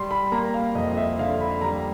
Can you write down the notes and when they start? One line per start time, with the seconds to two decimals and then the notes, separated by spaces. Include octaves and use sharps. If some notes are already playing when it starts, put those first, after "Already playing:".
Already playing: G3 C6
0.11 B5
0.32 A#3 A#5
0.54 F5
0.75 F2 D#5
0.89 D#5
0.97 E5
1.19 D3 F5
1.40 B5
1.62 G3 A#5